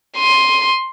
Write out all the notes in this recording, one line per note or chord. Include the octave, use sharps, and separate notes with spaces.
C6 D#7